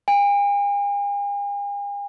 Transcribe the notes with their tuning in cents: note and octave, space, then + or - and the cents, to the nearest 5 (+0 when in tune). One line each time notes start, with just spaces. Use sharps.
G#5 -45